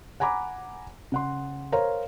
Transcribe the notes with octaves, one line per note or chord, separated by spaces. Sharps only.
F#5 G#5 A#5 B5 D6
C#3 F#5 C6
A#4 C5 C#5 F5 A#5